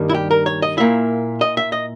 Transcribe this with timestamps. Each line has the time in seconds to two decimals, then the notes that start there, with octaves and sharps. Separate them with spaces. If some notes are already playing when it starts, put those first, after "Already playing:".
Already playing: G2 D#3 G3 A#3 D#4
0.09 E4
0.14 G4
0.31 A#4
0.46 C#5
0.62 D#5
0.77 A#2 A#3 E4 E5
1.41 D#5
1.57 E5
1.72 D#5